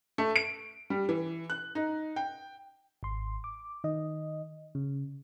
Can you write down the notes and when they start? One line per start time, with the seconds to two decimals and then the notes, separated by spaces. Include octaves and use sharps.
0.18 A3
0.36 D7
0.90 G3
1.09 E3
1.50 F#6
1.75 D#4
2.16 G5
3.03 G#1 C6
3.44 D6
3.84 D#3 D#5
4.75 C#3